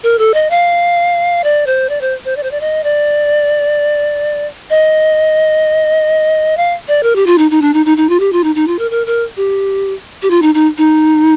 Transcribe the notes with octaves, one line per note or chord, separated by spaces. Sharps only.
A#4
A4
D#5
F5
D5
C5
D5
C5
C5
D5
C5
D5
D#5
D5
D#5
F5
D5
A#4
G4
F4
D#4
D#4
D4
D#4
D#4
D#4
F4
G4
F4
D#4
D#4
F4
A#4
A#4
A#4
G4
G4
F4
D#4
D#4
D#4